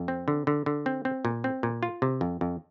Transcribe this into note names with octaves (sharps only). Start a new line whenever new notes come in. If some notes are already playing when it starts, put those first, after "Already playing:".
Already playing: F2
C4
D3
D3
D3
C4
C4
A#2
C4
A#2
F4
C3
F2
F2